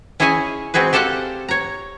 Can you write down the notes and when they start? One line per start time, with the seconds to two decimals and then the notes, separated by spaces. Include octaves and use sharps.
0.20 C#4 E4 G#4 C#5 D#5 G#5
0.74 G#3 C4 F#4 G#4 B4
0.93 G4 A4 C5 F5 F#5
1.48 C#5 A#5